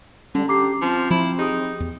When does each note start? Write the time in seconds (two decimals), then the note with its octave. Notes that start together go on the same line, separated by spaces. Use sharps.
0.35 D3 G3 C#4
0.48 D3 G4 A#5 D6 C7
0.81 F3 C4
1.10 F3 E4
1.38 D#4 G4 G#4 D#6
1.80 E2